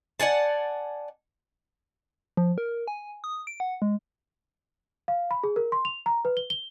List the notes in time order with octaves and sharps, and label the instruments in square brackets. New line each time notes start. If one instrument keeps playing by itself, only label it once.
[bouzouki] D5 F#5 G#5 A5
[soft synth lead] F3
A#4
G#5
D#6
D7
F#5
G#3
[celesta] F5
B5
G#4
A#4
C6
F7
A#5
B4
G7
G7